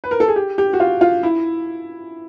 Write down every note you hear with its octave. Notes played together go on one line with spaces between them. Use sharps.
B4
A#4
A4
G#4
G4
G4
F#4
F4
F4
E4